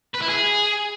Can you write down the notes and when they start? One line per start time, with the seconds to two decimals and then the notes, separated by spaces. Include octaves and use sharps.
0.14 B4
0.21 E4
0.29 G#4